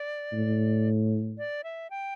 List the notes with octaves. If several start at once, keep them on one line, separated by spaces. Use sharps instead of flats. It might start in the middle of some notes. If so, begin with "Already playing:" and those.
Already playing: D5
A2
D5
E5
G5